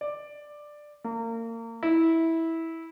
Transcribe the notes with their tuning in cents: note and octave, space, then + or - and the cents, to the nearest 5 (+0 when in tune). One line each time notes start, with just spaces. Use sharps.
D5 +10
A#3 -30
E4 -15